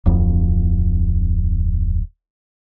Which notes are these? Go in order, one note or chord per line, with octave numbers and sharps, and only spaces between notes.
D1 F2